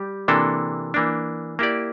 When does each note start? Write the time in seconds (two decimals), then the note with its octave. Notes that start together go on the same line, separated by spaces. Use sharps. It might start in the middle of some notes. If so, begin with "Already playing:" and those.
Already playing: G3 G4
0.28 C3 E3 A#3 D4 A4
0.94 E3 A#3 D4
1.59 A#3 E4 G4 D5